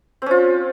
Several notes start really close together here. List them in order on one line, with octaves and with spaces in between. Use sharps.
C4 C#4 F4